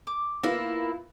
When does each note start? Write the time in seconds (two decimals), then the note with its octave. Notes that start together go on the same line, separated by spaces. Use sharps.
0.07 D6
0.43 A#3 B3 E4 F4